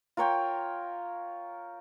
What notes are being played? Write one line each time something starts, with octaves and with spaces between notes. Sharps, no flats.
F4 A#4 C#5 G5